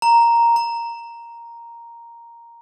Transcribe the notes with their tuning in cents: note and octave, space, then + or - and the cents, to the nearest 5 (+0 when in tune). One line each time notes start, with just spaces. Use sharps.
A#5 +0
A#5 +0